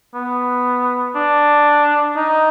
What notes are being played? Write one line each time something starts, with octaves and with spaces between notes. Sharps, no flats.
B3
D4
D#4